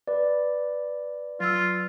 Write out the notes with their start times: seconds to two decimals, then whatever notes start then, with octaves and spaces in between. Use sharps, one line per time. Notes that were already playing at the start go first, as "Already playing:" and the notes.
0.08 B4 D5
1.40 F#3 F4 E6